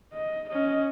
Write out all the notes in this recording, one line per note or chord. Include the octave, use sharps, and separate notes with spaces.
D#5
C#4 D#5